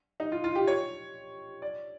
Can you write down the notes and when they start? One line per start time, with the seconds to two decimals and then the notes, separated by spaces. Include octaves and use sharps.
0.20 D#4
0.32 F4
0.44 F4
0.55 G4
0.67 C#5
1.62 D5